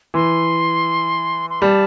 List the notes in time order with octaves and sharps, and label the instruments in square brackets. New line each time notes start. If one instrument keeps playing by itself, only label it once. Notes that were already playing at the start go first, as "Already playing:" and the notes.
[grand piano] E3 [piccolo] C6
[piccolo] C6
[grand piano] G3 [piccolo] A5